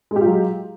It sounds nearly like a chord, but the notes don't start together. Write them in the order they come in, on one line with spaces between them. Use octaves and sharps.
G#3 G4 F4 F#3